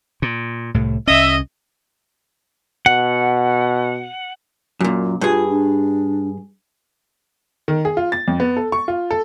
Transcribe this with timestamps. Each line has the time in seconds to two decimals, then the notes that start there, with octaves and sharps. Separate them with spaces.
0.22 A#2
0.74 C2 A2
1.07 C2 C#4 D#5 E5
2.86 B2 F#5
4.80 F#2 A#2
5.21 G2 F4 G#4
5.50 D4
7.68 D#3
7.85 G#4
7.97 F4
8.12 A6
8.28 F2
8.40 B3
8.57 A4
8.72 C#6
8.88 F4
9.11 A4